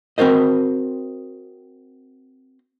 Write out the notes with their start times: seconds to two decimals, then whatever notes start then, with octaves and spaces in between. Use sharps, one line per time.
0.18 C4 F#4 A#4 C5 D#5